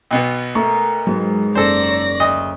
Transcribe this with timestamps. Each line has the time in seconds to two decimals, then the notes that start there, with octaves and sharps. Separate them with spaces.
0.11 B1 B2 B3
0.55 A3 A#4 C#6
1.07 G#2 F#3
1.55 F#1 A4 C5 D5 A#6
1.88 C#5
2.20 D2 D#5